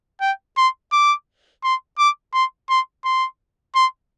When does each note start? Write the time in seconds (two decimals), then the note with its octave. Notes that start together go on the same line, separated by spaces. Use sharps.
0.21 G5
0.57 C6
0.92 D6
1.64 C6
1.98 D6
2.33 C6
2.70 C6
3.05 C6
3.75 C6